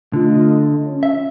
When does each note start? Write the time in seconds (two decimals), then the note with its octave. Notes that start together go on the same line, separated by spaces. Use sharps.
0.13 D3 A3 F4 D#5
0.85 C#4
1.03 E5